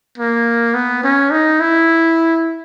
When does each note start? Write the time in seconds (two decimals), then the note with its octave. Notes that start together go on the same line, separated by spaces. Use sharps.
0.18 A#3
0.74 B3
1.04 C#4
1.31 D#4
1.60 E4